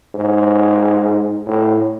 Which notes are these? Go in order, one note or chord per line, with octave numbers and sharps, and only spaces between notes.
G#2
A2